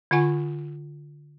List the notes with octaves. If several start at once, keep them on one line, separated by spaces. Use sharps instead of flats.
D3 F4 F#5 G#5 C#6